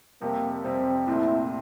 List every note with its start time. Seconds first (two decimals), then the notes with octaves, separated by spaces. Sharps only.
0.21 F2 C3 G3 A#3
0.64 F2 C3 G3 C4
1.07 C2 A#2 A3 C4 E4